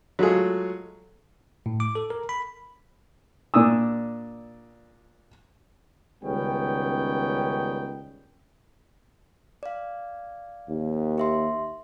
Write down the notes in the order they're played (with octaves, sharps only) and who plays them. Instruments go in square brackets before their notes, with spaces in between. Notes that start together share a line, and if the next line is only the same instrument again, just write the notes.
[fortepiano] F#3 G#3 A3 F4 G#4
[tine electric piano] A2
D6
A4
A#4
B5
[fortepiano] A#2 D4 D#6 E6
[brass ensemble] C#2 D#3 G3 B3 C#4 G5
[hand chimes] D5 F5
[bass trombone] D#2
[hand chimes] G4 E5 C6